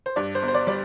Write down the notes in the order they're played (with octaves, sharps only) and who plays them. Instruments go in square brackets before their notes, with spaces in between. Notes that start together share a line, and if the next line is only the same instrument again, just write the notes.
[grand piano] C5
G2 D5
C5
G1
C5
D5
G3 D5